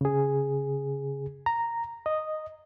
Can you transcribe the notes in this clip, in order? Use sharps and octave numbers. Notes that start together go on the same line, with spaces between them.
C#3 G#4
A#5
D#5